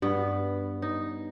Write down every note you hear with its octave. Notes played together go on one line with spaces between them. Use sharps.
G2 B3
D#4